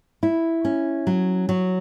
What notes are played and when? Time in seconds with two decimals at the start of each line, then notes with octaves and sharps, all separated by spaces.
0.23 E4
0.65 C#4
1.07 F#3
1.49 F#3